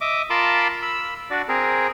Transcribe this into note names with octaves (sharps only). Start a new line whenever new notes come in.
D#5 E5 D6
F4 A#4 A5 B5 C6 D6
B5 E6
D4 F#4 D5
C4 G#4 A#4